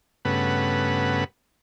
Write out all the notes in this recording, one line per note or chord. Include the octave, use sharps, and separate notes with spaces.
G2 C#3 A3 B3 B4 F#5